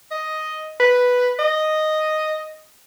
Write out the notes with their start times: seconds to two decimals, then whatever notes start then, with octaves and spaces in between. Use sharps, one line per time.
0.11 D#5
0.80 B4
1.39 D#5